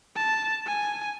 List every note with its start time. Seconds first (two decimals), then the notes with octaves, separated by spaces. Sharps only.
0.17 A5
0.67 G#5